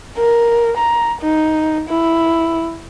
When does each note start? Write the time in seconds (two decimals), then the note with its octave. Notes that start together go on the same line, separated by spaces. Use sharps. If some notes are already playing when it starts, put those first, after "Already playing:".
0.17 A#4
0.77 A#5
1.21 D#4
1.89 E4